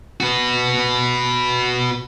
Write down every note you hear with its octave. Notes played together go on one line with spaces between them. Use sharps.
F#4 B4